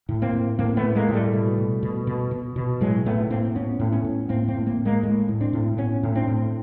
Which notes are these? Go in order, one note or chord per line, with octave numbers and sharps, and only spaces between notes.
A2
A#3 C4
A2
A2 A#3 C4
A3 B3
A2
G#3 A#3
A2
G3 A3
B2
B2
B2
B2
B2
B2
A2 F#3 G#3
A2 A3 B3
A2 A#3 C4
A2 B3 C#4
A2
B3 C#4
A2
A2 A#3 C4
A#3 C4
A2
A#3 C4
A2
G#3 A#3
A2 G#3 A#3
A2
C4 D4
A2
A2 B3 C#4
A2
C4 D4
A2